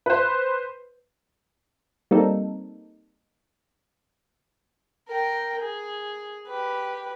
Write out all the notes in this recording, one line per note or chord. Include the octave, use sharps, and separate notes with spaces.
B4 C5
G3 A#3 C4 D#4 A4
A#4 G5
G#4
G4 B4